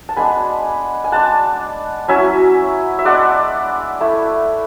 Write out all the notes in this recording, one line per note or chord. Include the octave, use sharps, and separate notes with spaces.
A5
G#3 B3 D4 G#5 B5
G#5
G#3 D4 F#5 A5
F#3 C#4 E4 E5 G#5
E5
G#3 B3 D4 D5 F#5
A3 E4